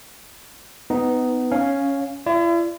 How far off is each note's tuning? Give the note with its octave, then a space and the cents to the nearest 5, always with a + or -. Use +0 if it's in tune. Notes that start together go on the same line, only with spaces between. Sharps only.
B3 +20 D#4 +0
C#4 +0 F5 +0
E4 +45 D5 +0